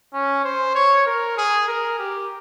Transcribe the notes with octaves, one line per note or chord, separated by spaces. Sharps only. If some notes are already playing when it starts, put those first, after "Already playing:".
C#4
C5
C#5
A#4
G#4
A#4
G4